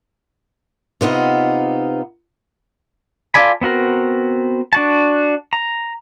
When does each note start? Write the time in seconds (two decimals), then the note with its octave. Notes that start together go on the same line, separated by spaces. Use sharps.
1.01 C3 B3 D#4 F4
3.34 F4 A4 D5 G#5 B5
3.61 B3 C4 F#4 A#4
4.73 D4 F#4 A5
5.53 A#5